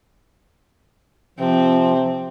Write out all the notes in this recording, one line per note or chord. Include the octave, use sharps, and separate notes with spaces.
C3 F3 C4